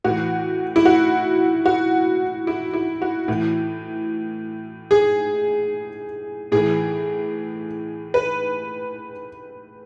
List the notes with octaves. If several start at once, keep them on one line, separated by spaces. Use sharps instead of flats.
A2 E3 F#4
E4
F#4
F#4
E4
E4
F#4
A2 E3
G#4
A2 E3 G#4
B4